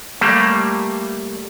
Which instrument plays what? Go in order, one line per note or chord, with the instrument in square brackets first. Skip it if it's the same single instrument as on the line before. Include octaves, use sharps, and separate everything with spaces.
[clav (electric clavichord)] G3 A3 A#3